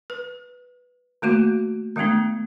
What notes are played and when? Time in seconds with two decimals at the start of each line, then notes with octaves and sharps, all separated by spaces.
0.10 B4
1.22 D#3 A3 A#3 F#4
1.96 D#3 G#3 A3 B3 D4